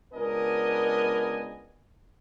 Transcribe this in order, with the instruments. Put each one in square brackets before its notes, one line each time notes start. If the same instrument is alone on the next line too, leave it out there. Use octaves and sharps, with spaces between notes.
[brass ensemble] C#2 B3 D4 A#4 D#5 G#5